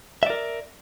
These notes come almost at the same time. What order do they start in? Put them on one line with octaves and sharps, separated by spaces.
E5 D5 A#4